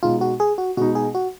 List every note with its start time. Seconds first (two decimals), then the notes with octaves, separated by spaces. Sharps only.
0.03 B2 G#3 D#4 F4
0.21 F#4
0.40 G#4
0.58 F#4
0.77 B2 G#3 D#4 F#4
0.95 G#4
1.15 F#4